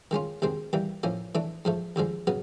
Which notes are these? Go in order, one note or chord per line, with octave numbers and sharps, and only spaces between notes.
D#3 G#3 C#4 F4
D2 C3 D#3 G#3 C4
E3 G3 A#3
A2 F3 A#3 C#4
E3 A3 D4
G#2 F3 A3
D#2 D3 F3 G#3
C#3 F#3 B3